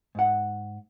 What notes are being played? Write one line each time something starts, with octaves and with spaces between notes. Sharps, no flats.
G#2 F#5